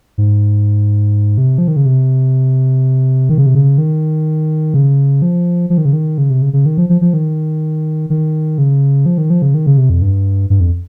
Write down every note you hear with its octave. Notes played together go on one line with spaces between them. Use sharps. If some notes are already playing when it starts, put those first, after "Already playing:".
G#2
C3
F3
D#3
C#3
C3
D#3
C#3
C3
C#3
D#3
C#3
F3
F3
D#3
C#3
D#3
C#3
C3
C#3
C#3
D#3
F3
F3
F3
D#3
D#3
C#3
F3
D#3
F3
C#3
D#3
C#3
C3
F2
G2
G2
F2